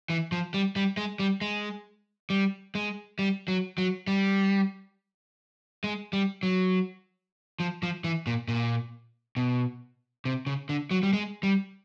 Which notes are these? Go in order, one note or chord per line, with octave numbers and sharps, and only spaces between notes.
E3
F3
G3
G3
G#3
G3
G#3
G3
G#3
G3
F#3
F#3
G3
G#3
G3
F#3
F3
F3
E3
A#2
A#2
B2
C3
C#3
D3
F#3
G3
G#3
G3